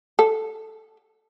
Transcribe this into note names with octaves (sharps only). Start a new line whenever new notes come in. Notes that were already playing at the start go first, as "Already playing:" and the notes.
A4